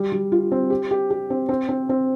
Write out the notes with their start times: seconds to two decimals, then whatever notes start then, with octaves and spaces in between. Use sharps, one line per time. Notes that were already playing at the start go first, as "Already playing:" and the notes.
Already playing: G3
0.12 G3
0.32 F4
0.52 C4
0.70 G4
0.91 G4
1.10 G4
1.30 C4
1.49 C4
1.69 C4
1.89 C4